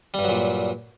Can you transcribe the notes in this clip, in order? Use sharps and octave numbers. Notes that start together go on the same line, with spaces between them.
G2 A#2 F#3 G3